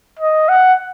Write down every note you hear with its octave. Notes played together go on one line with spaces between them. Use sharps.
D#5
F#5